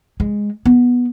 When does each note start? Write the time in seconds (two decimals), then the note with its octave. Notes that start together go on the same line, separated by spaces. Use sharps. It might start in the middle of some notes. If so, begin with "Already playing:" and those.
0.20 G#3
0.66 B3